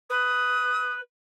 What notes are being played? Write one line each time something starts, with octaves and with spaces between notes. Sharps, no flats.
B4 D#6